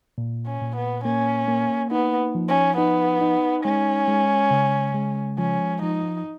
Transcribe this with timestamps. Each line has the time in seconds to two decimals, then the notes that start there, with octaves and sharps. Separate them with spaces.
0.18 A#2
0.46 C#4
0.61 A#2
0.76 B3
1.04 A#3 C#4
1.48 A#3
1.91 B3 D#4
2.35 F3
2.49 C#4
2.77 B3 D#4
3.21 D#4
3.64 G#3 C#4
4.08 G#3
4.51 C#3
4.94 G#3
5.38 F3 C#4
5.82 F3 D#4